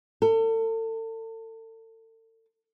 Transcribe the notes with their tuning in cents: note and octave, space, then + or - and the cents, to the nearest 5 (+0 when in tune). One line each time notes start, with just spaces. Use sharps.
A4 +35